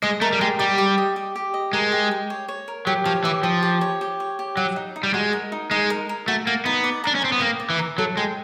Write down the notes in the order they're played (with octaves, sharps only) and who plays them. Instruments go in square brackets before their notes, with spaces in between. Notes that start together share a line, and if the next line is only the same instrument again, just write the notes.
[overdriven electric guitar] G#3 [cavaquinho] D#5
[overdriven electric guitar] A3 [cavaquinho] A#4
[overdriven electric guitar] G3
[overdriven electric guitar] G#3 [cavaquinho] G4
[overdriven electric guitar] G3 [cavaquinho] G4
[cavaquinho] G4
D#5
G4
G4
D#5
[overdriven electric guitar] G#3 [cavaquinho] A#4
[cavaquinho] G4
G4
C#5
C#5
A#4
[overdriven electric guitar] F#3 [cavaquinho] G4
[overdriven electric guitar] F3 [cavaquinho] C#5
[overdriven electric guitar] E3 [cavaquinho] G4
[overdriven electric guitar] F3 [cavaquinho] G4
[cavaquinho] G4
C#5
G4
C#5
G4
[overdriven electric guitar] F#3 [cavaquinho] F#4
[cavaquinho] D#4
D#4
[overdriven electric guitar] G3
[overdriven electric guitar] G#3 [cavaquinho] F#4
[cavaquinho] A#4
D#4
[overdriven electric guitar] G#3 [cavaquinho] D#4
[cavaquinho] A#4
A#4
[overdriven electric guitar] A3 [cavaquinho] F#4
[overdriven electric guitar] A#3 [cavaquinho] F#4
[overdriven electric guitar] B3 [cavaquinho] D#4
[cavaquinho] D5
[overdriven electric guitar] D4 [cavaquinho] A#5
[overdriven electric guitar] C#4
[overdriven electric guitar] C4 [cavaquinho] A#5
[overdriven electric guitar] B3
[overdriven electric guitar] A#3 [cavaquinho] G5
[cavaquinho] D5
[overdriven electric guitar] E3
[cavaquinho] A#5
[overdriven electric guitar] F#3 [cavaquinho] A4
[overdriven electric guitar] G#3 [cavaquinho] G5